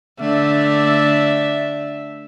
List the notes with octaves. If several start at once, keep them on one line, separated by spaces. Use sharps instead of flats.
D3 A3 D4 E5